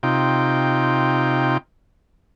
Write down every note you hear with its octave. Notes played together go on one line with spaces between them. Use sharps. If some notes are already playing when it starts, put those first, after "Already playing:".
C3 D#4 F4 G5